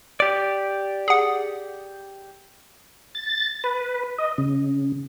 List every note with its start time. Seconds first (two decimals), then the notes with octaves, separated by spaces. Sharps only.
0.20 G4 D5
1.08 G#4 F#5
3.15 A6
3.64 B4
4.18 D#5
4.38 C#3